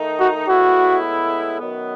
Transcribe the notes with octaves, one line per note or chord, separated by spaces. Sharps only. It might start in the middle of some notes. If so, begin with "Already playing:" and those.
Already playing: D#3 A3 D#4
F#4
A2 G#3 B3 E4 F#4
F#2 D#3 F#3 B3